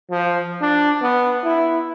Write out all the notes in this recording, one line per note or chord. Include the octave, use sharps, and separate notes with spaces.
F3
D4
B3
E4